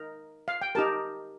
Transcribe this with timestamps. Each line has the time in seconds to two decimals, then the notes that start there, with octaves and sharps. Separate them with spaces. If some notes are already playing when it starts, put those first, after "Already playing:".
Already playing: D#4 A#4
0.48 F5
0.61 G5
0.75 D#4 G4 A#4 A5